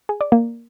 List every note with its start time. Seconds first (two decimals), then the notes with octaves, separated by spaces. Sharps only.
0.09 G#4
0.21 D5
0.32 A#3